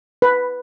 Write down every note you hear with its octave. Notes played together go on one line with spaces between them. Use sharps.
B4